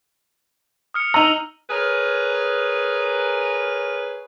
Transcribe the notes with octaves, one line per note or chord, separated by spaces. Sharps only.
D#6 F6 C#7
D#4 A#5 E6 D#7 F7
G#4 A#4 B4 C#5